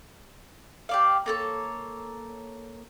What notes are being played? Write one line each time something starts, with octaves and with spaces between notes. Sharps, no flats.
G4 D5 F5
A#3 A4 C#5